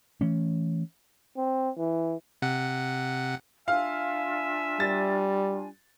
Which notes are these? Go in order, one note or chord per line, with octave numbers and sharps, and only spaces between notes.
E3 A3 C#4
C4
E3
C3 F#5
D4 F4 E5 F5 G#5
G3 A6